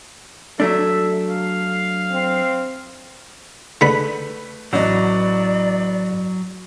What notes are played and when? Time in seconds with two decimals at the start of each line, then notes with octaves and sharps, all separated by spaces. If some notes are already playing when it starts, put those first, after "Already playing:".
0.60 F#3 A3 D4 A4 E5
1.29 F5
2.12 C4
3.81 D3 G#3 A3 B4 B5
4.73 A1 F#3 D5 D#5